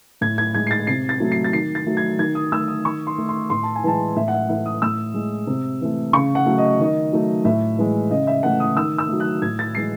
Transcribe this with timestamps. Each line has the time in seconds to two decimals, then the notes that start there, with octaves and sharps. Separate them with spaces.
0.21 A2 G#6
0.38 G#6
0.54 G#3 G#6
0.67 C7
0.71 A6
0.87 C3 C7
1.09 A6
1.20 F#3 A3
1.32 C7
1.44 A6
1.53 D#3 C7
1.75 A6
1.86 F#3 A3
1.97 G#6
2.19 D#3 G#6
2.35 D#6
2.52 A3 E6
2.68 D#6
2.85 D#3 C#6
3.07 C6
3.18 A3
3.29 C6
3.50 A2 C6
3.63 A5
3.76 G#5
3.83 E3 G#3 A5
4.16 A2 E5
4.28 F#5
4.33 E5
4.49 E3 A3 E5
4.66 D#6
4.82 A2 E6
5.14 G#3
5.47 C3
5.81 E3 A3
6.13 C#3 C#6
6.35 F#5
6.46 F#3 A3
6.58 D#5
6.80 D#3 D#5
7.13 F#3 A3
7.45 A2 E5
7.78 E3 G#3
8.11 C#3 D#5
8.27 E5
8.43 E3 A3 F#5
8.60 D#6
8.76 D#3 E6
8.98 E6
9.09 F#3 A3
9.20 F#6
9.42 A2 G#6
9.59 A6
9.75 E3 G#3 C7